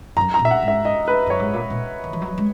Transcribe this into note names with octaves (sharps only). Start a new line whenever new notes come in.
F#2 A#5
A#5
A#2
E5
F#5
G#2
E5
D#5
B4
F#2 C#5
G#2
A#2
A#2
D#3
E3
F#3
G#3